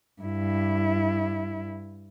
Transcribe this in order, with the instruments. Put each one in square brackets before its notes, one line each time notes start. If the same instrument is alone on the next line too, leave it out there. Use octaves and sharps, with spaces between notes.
[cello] G2 E4